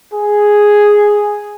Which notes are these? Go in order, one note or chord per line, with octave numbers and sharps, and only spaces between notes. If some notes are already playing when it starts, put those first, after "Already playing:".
G#4